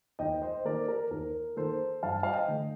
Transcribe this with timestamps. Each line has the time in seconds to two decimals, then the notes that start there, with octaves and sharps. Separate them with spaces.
0.19 D#2 D#5 G5
0.42 C5 D#5
0.65 D#3 A#3 A#4 D5
0.88 A#4
1.11 D#2 A#4
1.56 D#3 A#3 A4 C5
2.03 G2 F5 A5
2.23 F5
2.32 D#5 G5
2.48 D3 A3